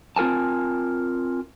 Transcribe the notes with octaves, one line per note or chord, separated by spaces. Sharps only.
C4 F4 A#4 G#5 A5